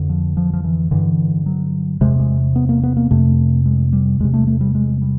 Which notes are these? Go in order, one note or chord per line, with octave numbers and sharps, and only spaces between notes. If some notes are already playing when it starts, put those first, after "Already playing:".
Already playing: F2 D3
F3
F3
F3
E3
G2 D3 E3
F#3
E2 C3 G#3
G#3
B3
A#3
B3
A#3
F2 C3 A3
G#3
G3
E2 C3 G#3
A3
A3
G3
G#3
G3